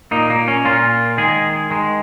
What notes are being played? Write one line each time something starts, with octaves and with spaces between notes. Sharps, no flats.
A#2 A#3 D#4
A#3
C#4
A#2 A#3 F4
D#3 G#3 G#4
D#3 G#3